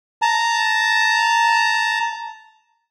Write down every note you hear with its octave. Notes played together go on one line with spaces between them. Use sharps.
A5 A#5